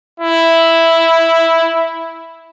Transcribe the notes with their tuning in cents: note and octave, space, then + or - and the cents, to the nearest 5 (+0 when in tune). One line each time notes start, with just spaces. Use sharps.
E4 +0